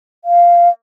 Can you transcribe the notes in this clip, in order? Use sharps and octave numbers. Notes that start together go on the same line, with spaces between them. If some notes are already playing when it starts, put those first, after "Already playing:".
F5